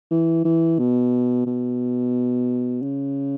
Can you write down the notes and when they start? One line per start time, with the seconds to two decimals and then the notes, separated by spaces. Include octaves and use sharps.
0.11 E3
0.45 E3
0.79 B2
1.47 B2
2.82 C#3